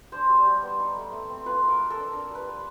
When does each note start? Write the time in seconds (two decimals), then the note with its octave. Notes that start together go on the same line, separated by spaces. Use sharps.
0.12 D4 C5
0.29 G3
0.46 G3
0.63 B3
0.80 D#4
0.96 A3
1.13 A3
1.30 C4
1.46 F4 B4
1.63 A#3
1.69 A#4
1.80 A#3
1.90 A4
1.96 D4
2.13 D4 A#4
2.30 G3
2.35 B4
2.47 F4